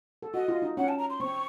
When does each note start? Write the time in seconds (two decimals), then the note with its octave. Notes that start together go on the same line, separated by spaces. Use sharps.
0.22 A4
0.34 F#4 D#5
0.48 F4
0.62 D#4
0.77 C#4 F#5
0.89 A5
0.98 A#5
1.10 C6
1.20 C4 C#6